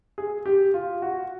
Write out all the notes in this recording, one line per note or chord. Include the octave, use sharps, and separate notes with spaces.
G#4
G4
F4
F#4